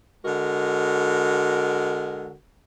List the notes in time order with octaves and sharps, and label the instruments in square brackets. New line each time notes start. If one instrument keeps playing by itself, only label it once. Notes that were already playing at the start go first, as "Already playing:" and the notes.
[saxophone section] D3 G#3 F#4 A#4